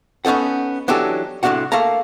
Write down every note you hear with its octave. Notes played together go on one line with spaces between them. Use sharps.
B3 C#4 D#4 A4 F#5
E3 F#3 D4 D#4 G4 A4
C2 A2 E3 D4 F#4 F#5
A3 A#3 F5 A5 A#5